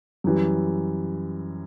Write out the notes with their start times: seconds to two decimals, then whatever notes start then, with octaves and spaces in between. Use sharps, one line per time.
0.24 F#2 E3 G3